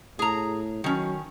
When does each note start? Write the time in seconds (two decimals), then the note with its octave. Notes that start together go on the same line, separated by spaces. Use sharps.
0.19 A2 G#4 A#5
0.84 D#3 F#3 C#4